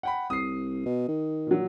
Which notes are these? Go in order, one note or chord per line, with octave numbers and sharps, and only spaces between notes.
F#5 G5 B5
C2 D#6 C7
B2
D#3
A#2 F#3